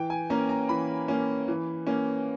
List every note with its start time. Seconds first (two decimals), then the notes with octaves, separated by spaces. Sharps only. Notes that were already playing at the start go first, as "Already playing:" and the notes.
Already playing: E3 G5
0.10 G#5
0.30 A#3 C#4 A#5
0.49 A#5
0.69 E3 B5
1.08 A#3 C#4
1.48 E3
1.87 A#3 C#4